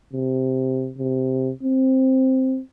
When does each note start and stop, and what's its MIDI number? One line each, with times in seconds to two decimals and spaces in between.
0.13 0.91 48
0.98 1.51 48
1.63 2.60 60